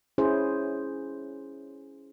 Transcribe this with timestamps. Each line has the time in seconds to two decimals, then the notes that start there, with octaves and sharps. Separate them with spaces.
0.18 C#4 E4 G#4 C5